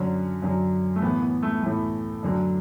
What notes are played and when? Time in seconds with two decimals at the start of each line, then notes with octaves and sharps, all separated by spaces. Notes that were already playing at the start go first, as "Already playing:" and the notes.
Already playing: F#2 D3 F#3 C#4
0.42 F#2 D3 F#3
0.96 A3
1.02 A2 E3 B3
1.22 B3
1.43 A3
1.63 A2 E3 A3
2.23 F#2 D3 F#3